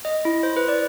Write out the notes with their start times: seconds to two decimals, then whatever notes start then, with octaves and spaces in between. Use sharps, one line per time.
0.05 D#5
0.25 E4
0.43 C5
0.56 B4
0.68 D5